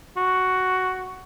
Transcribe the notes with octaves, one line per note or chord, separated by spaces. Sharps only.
F#4